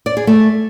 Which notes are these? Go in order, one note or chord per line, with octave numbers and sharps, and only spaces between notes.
D5
G#4
A3